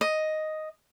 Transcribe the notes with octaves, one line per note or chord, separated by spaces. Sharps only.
D#5